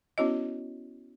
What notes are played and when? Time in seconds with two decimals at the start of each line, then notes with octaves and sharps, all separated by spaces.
0.18 B3 C#4 E4 F#4 C#5 D#5